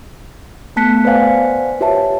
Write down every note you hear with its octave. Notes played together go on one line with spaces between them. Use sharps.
A3 B3 A5 F#6 B6 C#7
B4 C5 D5 F5 F#5 G#5
F4 G4 B4 C#5 E5 A5